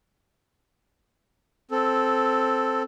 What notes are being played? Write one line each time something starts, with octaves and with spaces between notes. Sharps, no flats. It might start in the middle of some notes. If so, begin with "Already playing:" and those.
C4 A4